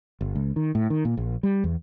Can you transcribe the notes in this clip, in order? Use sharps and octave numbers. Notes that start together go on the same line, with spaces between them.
G1
C#2
D#3
A2
D#3
A#2
A#1
G3
E2